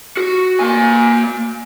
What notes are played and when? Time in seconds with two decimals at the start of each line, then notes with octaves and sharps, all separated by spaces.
0.17 F#4
0.60 A#3 G#5